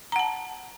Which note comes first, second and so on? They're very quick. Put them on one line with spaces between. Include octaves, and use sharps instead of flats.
A#5 F#5 A5